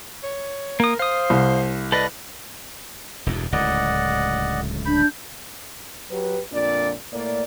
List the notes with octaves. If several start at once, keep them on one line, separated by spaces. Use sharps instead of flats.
C#5
A#3 A#4 D#6
C5 F5 D#6
C2
A4 B4 D5 D#5
E1 E2 G2
D1 C#2 A2 D5 D#5 F#5
D4 B5 G6
F#3 G4 B4
F2 A#2 D4 D5
A2 A#3 D5